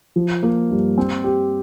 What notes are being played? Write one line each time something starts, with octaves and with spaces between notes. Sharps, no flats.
F3
A#3
G2
C4
G4